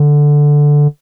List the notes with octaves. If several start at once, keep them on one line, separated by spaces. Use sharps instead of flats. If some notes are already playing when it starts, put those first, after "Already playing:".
Already playing: D3